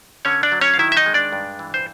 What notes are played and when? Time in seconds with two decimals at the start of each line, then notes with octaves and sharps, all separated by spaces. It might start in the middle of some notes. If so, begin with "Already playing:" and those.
0.25 D3 C#4 C#5
0.43 D4 D5
0.52 F#3
0.61 C#4 C#5
0.74 F5
0.79 D#3 E4 E5
0.92 E5
0.97 D#4 D#5
1.06 G#3
1.14 D4 D5
1.33 G2
1.59 E3
1.74 C5